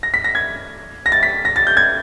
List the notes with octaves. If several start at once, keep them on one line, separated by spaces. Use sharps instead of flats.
A#6
B6
A#6
G#6
A#6
A6
B6
A#6
A6
G6
G#6